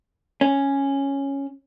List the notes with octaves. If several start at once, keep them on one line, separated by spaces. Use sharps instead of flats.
C#4